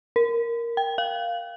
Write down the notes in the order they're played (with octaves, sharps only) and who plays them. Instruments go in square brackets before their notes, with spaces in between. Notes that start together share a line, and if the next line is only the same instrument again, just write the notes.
[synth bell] A#4
G5
F5